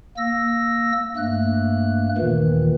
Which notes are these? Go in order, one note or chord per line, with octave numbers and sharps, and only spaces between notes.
A#3 E6 A#6
G2 A3 A#3 F#6
D#2 A#2 D#3 E3